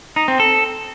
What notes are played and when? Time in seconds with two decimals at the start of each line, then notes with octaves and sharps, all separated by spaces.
0.16 D#4
0.28 C4
0.40 A4